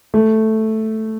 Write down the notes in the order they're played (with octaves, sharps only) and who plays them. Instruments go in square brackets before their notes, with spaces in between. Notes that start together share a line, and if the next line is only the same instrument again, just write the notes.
[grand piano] A3